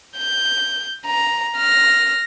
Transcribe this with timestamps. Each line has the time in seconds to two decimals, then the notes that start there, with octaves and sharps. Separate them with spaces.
0.18 G6
1.06 A#5
1.57 F6 A#6